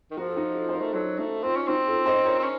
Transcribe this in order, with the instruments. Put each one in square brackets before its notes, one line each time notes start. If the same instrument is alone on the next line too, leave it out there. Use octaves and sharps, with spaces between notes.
[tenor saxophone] D#3
[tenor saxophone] F3 [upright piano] F#4 A#4
[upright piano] A4
D#4 F#4
F4 A4
C5
F#4 A#4
[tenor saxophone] A3
[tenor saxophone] F#3 [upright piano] A4 C5
[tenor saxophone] A3 [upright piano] D#4 F#4
[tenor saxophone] C4 [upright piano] F4
[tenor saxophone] C#4
[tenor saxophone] C4 [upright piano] D#4 F#4
[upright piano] F4 A4
C5 D#5
A#4 C#5
[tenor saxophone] C4
C#4